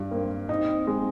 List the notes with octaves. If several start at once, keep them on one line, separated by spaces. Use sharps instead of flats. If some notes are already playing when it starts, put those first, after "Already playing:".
Already playing: G2
A#3 C4
C4 D#4
G#3